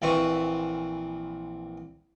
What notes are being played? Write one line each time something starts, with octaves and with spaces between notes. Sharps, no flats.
A#1 E3 C4 B4 E5 C#6